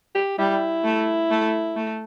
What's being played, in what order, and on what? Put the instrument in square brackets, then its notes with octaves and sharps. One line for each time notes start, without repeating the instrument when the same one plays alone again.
[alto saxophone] G4
[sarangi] G3 [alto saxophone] E4
[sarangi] A3
A3
A3